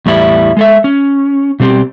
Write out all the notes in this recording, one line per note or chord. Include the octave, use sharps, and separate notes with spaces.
E2 A2 G3 E4
G#3 A4 E5
C#4
B2 G3 C4 G4